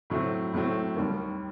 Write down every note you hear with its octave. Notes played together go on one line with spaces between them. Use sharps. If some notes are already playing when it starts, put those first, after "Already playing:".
A2 F#3 A3 C4
A2 F#3 A3 C4
D#2 D#3 G3